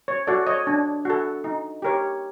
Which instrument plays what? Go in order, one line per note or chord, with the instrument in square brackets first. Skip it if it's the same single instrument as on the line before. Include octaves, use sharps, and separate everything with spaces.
[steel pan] C#5
F#4 A4 D5
C#5 D#5
D4
F#4 A4
D#4
G4 A#4 C#5